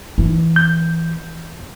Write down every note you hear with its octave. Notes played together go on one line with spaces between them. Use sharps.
E3
G6